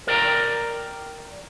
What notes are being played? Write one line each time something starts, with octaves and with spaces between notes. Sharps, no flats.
A#4 D5 G5 A5 A#5